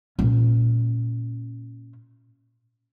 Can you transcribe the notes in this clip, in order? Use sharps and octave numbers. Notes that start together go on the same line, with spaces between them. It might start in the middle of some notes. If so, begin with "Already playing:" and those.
A#2 C#4